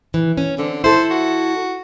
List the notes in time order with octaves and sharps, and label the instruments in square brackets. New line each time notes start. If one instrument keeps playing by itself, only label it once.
[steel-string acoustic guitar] E3
C#4
[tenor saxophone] D3 [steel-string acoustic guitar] C4
[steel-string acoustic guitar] E4 A4 [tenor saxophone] C5
[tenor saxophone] F#4